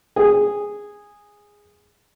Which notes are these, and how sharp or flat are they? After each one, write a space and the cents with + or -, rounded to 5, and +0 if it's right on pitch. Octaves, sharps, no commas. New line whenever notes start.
G#4 -10